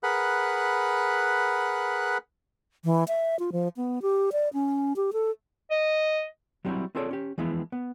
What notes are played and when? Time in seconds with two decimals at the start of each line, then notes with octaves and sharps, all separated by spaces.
0.03 G#4 A#4 B4 F#5 B5 F#6
2.85 E3
3.08 E5
3.39 F4
3.52 F3
3.77 B3
4.02 G4
4.32 D5
4.53 C#4
4.96 G4
5.13 A4
5.71 D#5
6.65 F#3 G3 C4 D4 E4 F#4
6.95 C4 F4 G#4 A4 C#5 D5
7.11 C#4 G4
7.38 E3 F3 G#3 B3 E4
7.72 B3